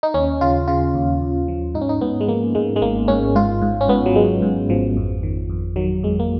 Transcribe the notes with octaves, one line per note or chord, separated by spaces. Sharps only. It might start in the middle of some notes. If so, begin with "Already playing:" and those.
D#4
D#2 C#4
C#3 F4
C#3 F4
D#2
D#2
F3
G#2 D#4
C#4
D#4
G#2 B3
G#3
F3 A#3
G#2 G#3
G#3
G#1 A#3
G#2 C#4
G#2 F4
G#2
C#4
G#2 B3
F#3
G#2 G#3
G#2
G#1 F3
F2
D#3
F2
D#3 F#3
F2 G#3
A#3